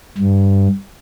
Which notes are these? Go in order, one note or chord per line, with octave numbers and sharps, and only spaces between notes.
G2